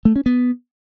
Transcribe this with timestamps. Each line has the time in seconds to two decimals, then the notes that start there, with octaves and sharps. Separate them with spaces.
0.05 A3
0.16 C#4
0.26 B3